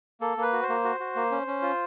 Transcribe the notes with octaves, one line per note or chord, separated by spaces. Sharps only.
A#3 A4
A#3 B4
F#4
C5
A#3
F#4
F#4
A#3
C#4
C#4
F4